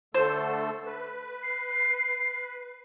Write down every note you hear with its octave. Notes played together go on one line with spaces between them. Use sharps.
D3 A3 A4 C5
B4
C7